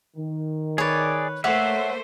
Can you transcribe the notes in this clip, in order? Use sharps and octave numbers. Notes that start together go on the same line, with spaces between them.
D#3
G#4 B4 C#5 D5
A3 A#3 C5 C#5 E5 F#5 D6